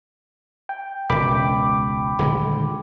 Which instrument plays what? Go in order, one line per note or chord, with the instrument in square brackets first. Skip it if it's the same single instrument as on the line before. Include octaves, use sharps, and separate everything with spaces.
[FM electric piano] G5
[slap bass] E1 C#2 [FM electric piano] G5 B5 D6
[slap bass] D#1 D3 G#3